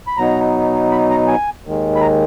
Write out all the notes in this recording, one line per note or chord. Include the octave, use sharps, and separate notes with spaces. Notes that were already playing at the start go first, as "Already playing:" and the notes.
B5
B2 F#3 B3 D#4 A#5
B5
A#5
G#5
D#2 D#3 G#3
B5
A#5